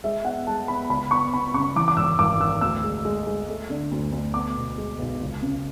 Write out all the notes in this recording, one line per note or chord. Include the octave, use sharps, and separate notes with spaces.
G#3 E5
B3 F#5
G#3 A5
B3 B5
C#2 B5
B3 C#6
B3 B5
C#3 C#6
E3 D6
D6
G#1 E6
G#1 D6
G#1 E6
D2 E6
G#3
G#3
G#3
A3
D3
D2
D2
B3 D6
B2
G#3
B1
C#2
C#3